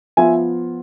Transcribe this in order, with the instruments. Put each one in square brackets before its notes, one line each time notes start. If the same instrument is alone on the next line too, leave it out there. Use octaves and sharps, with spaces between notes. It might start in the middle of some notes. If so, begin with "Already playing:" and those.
[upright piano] F3 B3 F4 E5 G#5